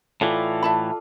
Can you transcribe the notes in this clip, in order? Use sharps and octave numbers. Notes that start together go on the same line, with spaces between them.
A2 E3 F4 A4 D5
E5 A5 B5